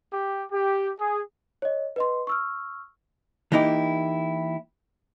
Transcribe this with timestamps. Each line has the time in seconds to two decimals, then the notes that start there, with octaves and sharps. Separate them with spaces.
0.12 G4
0.52 G4
1.00 G#4
1.62 C#5 D#5
1.96 B4 D#5 C6
2.27 C#6 E6 F6
3.52 E3 A#3 D#4 E4 G4